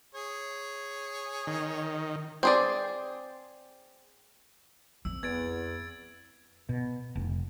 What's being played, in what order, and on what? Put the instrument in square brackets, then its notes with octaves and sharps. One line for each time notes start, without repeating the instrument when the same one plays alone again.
[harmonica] G#4 C#5
[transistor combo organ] D#3
[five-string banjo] C4 G#4 D5
[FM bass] A#1 [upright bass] F2 [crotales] E6
[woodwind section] E2 [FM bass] B3 [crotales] G#6 A6 D7
[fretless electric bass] B2
F1